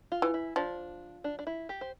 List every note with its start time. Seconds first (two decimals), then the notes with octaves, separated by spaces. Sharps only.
0.12 F4
0.22 E3
0.34 E4
0.56 F3 D4
1.24 D4
1.39 D4
1.47 E4
1.69 G4
1.81 C5